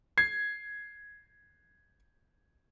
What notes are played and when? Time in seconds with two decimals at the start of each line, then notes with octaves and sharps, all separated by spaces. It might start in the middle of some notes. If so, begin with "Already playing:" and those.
0.18 G#6 C7